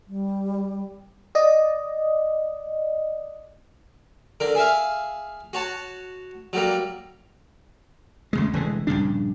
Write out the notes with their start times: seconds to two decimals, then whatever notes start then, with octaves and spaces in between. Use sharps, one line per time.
0.07 G3
1.35 D5 D#5
4.40 D3 A#4
4.55 G#4 E5 F5
5.53 F#4 C#5 A5
6.53 F#3 G3 A#3
8.33 D2 C#3 G#3
8.53 F1 D3 E3 G#3
8.87 A#1 G2 C#3 D4